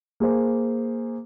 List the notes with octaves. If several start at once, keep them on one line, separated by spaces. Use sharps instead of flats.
A#3 G#4 C5